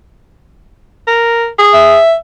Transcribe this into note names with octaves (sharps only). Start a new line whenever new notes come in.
A#4
G#4
E5